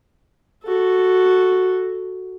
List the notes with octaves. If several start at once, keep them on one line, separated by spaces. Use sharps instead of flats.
F#4 A4